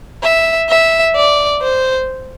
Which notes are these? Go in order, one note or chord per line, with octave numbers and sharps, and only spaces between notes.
E5
E5
D5
C5